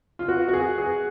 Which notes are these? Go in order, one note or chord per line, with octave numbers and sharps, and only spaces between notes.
F4
F#4
F#4
G#4
G#4